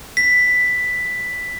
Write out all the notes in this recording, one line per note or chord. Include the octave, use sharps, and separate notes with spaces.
B6